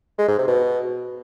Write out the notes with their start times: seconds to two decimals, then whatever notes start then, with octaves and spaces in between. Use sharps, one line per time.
0.18 G#3
0.28 G#2
0.38 C3
0.48 B2